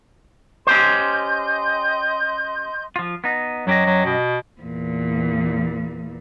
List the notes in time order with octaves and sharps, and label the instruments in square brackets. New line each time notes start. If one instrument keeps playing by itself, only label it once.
[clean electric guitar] C#4 G4 C5 [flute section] D#5 C6 G6
[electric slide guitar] F3 F4
B3 D#4
[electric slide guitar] F#2 G4 D#5 [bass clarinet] F#3
[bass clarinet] F#3
B2
[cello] E2 A#2